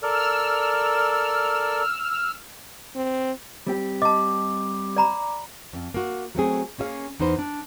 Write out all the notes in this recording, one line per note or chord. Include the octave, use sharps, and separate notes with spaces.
A4 A#4 D5 E6 F6
C4
G3 C4 G4
D#5 A5 D6
D5 A#5 B5
F2
A#3 F#4
F#3 A3 C4 G#4
A#3 C#4 G#4 E5 F5
E2 D#4 B4 C5
D4